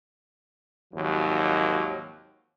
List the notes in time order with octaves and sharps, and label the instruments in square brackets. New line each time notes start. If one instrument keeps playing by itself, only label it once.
[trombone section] G#1 D#2 F3 F#3